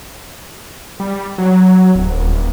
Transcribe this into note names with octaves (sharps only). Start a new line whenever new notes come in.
G3
F#3
D1
D#1